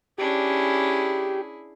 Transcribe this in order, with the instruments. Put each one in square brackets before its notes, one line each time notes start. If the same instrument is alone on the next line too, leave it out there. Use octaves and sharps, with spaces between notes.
[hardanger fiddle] C#4 D4 [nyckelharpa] E4 G#4 [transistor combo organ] G4